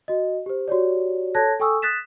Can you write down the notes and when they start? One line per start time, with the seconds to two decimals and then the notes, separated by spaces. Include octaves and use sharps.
0.08 F#4 D#5
0.46 G4 C5
0.68 F#4 G4 C#5 D5
1.35 A4 C#5 A5 F#6 G#6 A#6
1.60 A4 G5 G#5 C#6 D#6 E6
1.82 D#6 F#6 A6 B6 E7